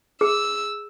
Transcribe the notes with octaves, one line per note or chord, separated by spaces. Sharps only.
G#4 E6